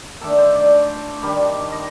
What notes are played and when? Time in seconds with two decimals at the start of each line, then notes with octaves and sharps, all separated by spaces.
0.21 D#3 A3 D4 A4
0.38 C5
0.55 D5
1.22 D#3 G3 D4
1.72 D#5